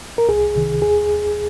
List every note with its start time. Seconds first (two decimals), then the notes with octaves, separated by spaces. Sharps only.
0.18 A#4
0.29 C2 G#4
0.55 C3 D#3
0.82 D#2 G#4